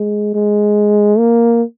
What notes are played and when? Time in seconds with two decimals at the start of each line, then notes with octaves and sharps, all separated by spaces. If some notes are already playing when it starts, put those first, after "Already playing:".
Already playing: G#3
0.34 G#3
1.18 A#3